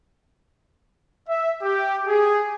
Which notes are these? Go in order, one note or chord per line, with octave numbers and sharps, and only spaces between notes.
E5
G4
G#4